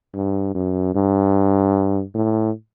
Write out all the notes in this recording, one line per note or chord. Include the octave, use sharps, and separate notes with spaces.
G2
F#2
G2
A2